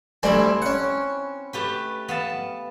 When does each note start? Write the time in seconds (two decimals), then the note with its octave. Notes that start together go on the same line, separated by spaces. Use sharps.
0.23 D2 G3 C4 D4 E4 G#5
0.62 C#4 F#5
1.53 A3 G4 B4
2.08 B3 F5 A5